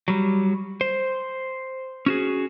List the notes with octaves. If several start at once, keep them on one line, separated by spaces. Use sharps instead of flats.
F#3 G3
C5
C#4 F#4 G#4